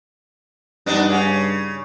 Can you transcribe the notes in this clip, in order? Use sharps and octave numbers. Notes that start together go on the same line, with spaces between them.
G2 B3 D4 D#4
C#3